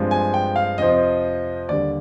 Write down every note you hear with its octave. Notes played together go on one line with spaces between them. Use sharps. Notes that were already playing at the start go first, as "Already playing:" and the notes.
Already playing: G2 F3 G#3 C4
G#5
G5
F5
F2 C3 F3 C4 D#5
D#2 D3 G3 D5